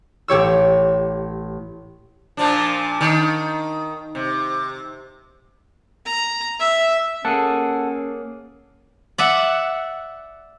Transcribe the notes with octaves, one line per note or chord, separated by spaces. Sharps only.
A1 G4 C#5 E6
A#2 F3 D4
D#3
C3
A#5
E5
A#3 C#4 G#4 A4 F#5 A5
D5 E5 F#5